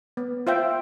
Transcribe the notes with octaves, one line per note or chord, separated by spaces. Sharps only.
B3
F4 C5 E5 G5